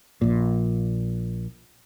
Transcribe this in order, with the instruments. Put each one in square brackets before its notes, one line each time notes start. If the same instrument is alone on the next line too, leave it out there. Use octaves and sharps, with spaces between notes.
[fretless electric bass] A#1 A#2